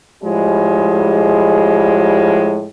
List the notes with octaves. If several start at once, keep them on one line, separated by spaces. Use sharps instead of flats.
A2 F3 G3 G#3